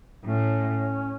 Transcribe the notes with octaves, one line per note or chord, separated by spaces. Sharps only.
A2 C#4